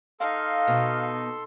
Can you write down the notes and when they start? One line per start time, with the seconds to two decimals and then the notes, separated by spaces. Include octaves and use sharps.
0.20 D#4 A4 F5 C6
0.68 B2